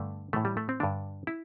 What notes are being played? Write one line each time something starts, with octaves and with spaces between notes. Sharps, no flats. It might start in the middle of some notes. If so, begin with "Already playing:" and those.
Already playing: G2 D3 A3
A2 E3 A3
G3
A3
C4
G2 D3 D4
E4